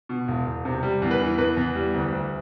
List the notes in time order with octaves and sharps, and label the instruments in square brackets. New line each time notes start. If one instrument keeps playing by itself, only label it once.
[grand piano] B2
E1
E1
C3
G3
E2
B4
E3
E2 B4
E2
G3
D2
D2